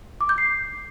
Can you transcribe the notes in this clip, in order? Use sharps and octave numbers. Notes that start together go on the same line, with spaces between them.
D6
G6
C7